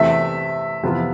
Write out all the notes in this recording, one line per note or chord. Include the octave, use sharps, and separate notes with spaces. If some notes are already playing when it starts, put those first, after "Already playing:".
Already playing: E2 C3 E3 A3 C4 E5
F2 C3 E3 B3 F4